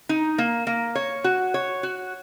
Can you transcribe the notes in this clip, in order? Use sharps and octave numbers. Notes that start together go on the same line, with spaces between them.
D#4
A#3
A#3
C#5
F#4
C#5
F#4